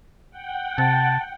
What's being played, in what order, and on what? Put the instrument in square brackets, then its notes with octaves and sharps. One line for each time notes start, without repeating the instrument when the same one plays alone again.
[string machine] F#5 G5
[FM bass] C3 [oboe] A5